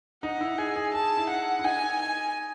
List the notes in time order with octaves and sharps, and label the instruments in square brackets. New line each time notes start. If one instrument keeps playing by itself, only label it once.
[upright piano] D#4 [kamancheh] F#5
[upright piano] E4
[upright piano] G#4 [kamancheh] G#5
[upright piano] G#4
[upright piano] G#4 [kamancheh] A5
[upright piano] E4
[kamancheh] F#5
[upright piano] E4
[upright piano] D#4 [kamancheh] G#5
[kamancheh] G#5